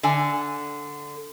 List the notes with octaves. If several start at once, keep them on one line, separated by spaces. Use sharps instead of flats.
D3 G#5